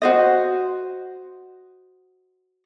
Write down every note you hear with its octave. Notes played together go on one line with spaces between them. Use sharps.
F#4 C5 D#5